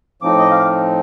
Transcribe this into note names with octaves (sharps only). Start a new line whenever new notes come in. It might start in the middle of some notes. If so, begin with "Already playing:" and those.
A2 F3 C4 D#4 D6
D#5
F5